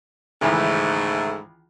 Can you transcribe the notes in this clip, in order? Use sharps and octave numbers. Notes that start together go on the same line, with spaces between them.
C#2 G#2 D#3 E3 A3